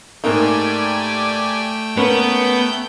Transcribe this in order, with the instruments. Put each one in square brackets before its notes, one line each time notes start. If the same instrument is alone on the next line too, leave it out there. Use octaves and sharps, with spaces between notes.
[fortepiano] G#2 A#3 D#4 [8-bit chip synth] A3 G5 [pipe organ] G4 D5 G#5
[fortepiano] A#3 C#4 B4 [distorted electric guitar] B3 [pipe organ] G6